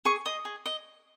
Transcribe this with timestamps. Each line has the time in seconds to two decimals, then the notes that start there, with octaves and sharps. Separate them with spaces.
0.05 G#4 C#6
0.26 D#5 D#6
0.45 G#4
0.66 D#5